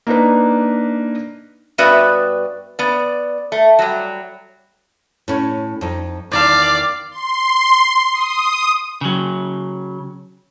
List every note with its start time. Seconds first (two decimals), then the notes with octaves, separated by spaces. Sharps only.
0.07 A#3 D4 D#4 B4
1.78 G2 B3 F#4 B4 D5 E5
2.79 B3 D5
3.52 A3
3.79 F#3 G3
5.28 A2 C#4
5.81 F2 D#4
6.31 E2 D#3 D5 F5 A5
7.11 C6
8.13 D#6
9.01 C#3 F#3